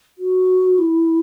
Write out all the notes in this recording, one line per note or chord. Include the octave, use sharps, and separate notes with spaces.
F#4
E4